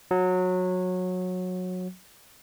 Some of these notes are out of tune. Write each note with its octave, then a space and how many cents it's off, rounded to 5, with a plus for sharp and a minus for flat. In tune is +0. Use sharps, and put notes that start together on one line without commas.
F#3 -20